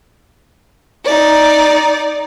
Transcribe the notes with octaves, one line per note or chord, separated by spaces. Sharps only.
D#4 D5